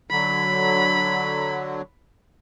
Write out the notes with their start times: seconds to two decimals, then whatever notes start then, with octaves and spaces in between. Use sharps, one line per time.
0.11 D3 F#3 B5